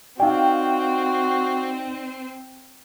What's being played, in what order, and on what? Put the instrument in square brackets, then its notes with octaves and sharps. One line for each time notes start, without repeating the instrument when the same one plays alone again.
[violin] C4 [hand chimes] D#4 D5 [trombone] F#4 [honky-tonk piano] F5 G5